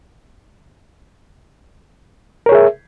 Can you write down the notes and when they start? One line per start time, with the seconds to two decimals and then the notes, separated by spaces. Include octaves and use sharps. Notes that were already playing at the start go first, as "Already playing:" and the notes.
2.46 A#4
2.49 C#5
2.52 G#4
2.55 E5